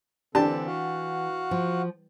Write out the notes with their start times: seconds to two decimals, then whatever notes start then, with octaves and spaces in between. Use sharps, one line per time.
0.35 D3 E3 C4 D4 G4 A4 A5
0.66 F#4 F5 F#5
1.51 F3